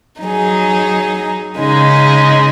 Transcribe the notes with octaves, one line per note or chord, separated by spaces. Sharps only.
F#3 D#4 G#4
C#3 G#3 D#4